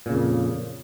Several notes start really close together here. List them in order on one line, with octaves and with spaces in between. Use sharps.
A#2 C#3 F2